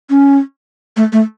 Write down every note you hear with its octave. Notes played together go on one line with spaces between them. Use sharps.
C#4
A3
A3